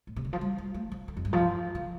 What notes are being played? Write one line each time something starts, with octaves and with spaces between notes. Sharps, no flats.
A2
C3
D3
F3
G3
G3
A3
F3
D3
F2
G2
F3
D3